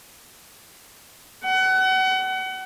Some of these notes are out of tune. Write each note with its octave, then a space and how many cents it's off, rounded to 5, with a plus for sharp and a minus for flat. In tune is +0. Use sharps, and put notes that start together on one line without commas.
F#5 +30